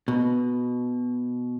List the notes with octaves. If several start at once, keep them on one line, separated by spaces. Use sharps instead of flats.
B2